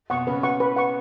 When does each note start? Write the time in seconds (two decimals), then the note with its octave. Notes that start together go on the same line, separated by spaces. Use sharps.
0.10 B2 F#5 C#6
0.27 C#3 B4
0.43 F#5 C#6
0.60 B4
0.76 F#5 C#6